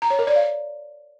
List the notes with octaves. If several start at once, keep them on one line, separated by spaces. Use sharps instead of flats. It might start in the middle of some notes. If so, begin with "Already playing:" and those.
A#5
C#5
A#4
D5
F5